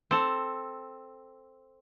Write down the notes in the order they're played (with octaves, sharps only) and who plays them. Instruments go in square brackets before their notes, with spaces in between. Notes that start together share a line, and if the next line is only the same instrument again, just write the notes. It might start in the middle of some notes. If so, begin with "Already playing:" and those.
[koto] C4 A4